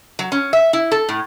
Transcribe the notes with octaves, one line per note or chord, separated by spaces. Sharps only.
F#3
C#4
E5
E4
A4
A2